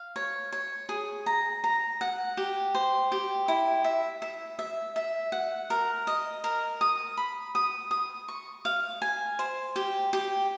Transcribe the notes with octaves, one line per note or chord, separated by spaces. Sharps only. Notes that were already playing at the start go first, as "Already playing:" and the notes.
Already playing: F5
C#5
C#5
G#4
A#5
A#5
F#5
G4
C5
G4
E4
E5
E5
E5
E5
F#5
A#4
D#5
A#4
D#6
B5
D#6
D#6
C#6
F5
G#5
C5
G4
G4